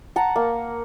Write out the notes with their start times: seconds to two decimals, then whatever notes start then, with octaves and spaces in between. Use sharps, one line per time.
0.16 F#5 A5 A#5
0.36 A#3